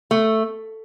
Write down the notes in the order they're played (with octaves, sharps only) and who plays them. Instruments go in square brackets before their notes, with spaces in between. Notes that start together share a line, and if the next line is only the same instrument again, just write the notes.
[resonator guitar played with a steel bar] A3